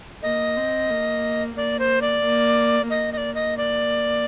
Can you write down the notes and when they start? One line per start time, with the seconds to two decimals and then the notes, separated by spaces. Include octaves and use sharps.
0.23 A#3 D#5
0.57 C4
0.90 A#3
1.57 A#3 D5
1.79 C5
2.02 D5
2.24 A#3
2.90 A#3 D#5
3.13 D#5
3.17 D5
3.35 D#5
3.58 D5